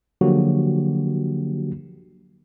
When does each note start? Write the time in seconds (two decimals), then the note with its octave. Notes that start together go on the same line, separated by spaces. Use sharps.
0.21 D3 F3 F#3 A#3 F#4 G4